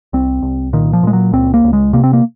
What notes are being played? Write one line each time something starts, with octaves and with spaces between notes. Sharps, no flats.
C2 C4
C2
A#2 D#3
F3
A#2 G#3
F#3
C#2 C4
A#3
C#2
G#3
C3 A#3
C4
A#3